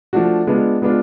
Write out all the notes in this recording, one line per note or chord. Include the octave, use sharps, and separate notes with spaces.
F3 A3 D4 F#4
G#3 B3 D4 F4
G#3 B3 D4 F4